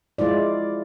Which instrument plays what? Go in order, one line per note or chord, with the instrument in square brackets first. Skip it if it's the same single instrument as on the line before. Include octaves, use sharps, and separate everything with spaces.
[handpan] G#3 E4 F4 D5